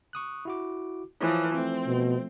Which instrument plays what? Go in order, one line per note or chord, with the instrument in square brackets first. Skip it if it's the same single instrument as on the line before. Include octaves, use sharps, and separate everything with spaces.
[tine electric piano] C#6 D#6 F#6
E4 F#4 D6
[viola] E3 F3 [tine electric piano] C#5
[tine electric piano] F3 A3 [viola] C4
[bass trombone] B2